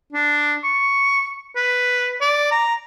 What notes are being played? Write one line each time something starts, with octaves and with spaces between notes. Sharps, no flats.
D4
C#6
B4
D5
A#5